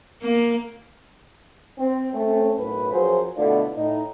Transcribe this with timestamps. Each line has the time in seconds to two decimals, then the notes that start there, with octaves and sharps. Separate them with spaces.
0.22 A#3
1.79 C4
2.13 A3 C4 C#4
2.58 B1 F#2 A2 B4
2.92 F#2 F3 F#3 G#4 C5
3.37 B2 D3 A3 D4 E4 F4
3.75 A2 D#4